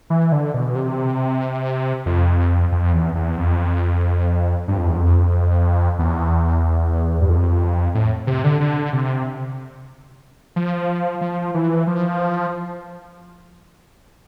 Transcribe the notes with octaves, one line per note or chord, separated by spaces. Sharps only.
E3
D3
B2
C3
F2
F2
E2
E2
F2
G2
F2
E2
F2
E2
G2
F2
A2
C3
D3
D3
C3
F3
F3
E3
F3